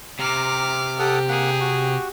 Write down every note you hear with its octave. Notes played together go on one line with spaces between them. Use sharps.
C3 A#5 D6 F6
G4 A4 F#5 D#6
A#3 G#4 F#5
F#4